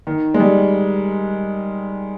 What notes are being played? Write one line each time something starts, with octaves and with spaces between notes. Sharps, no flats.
D#3
G#3
G3